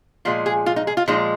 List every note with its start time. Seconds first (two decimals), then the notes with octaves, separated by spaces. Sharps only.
0.25 A#2 F3 G#3 F4
0.46 G#4
0.66 F4
0.76 D#4
0.87 G#4
0.97 F4
1.08 A#2 F3 G#3 D#4